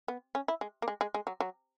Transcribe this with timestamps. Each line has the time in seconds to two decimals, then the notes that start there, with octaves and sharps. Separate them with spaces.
0.08 B3
0.35 C#4
0.48 E4
0.61 G#3
0.82 A#3
0.88 G#3
1.01 G#3
1.14 G#3
1.27 F#3
1.40 F#3